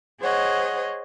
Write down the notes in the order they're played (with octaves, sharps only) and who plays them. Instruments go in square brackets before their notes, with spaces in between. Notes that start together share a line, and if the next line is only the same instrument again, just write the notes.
[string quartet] G#4 C5 C#5 D#5 F#5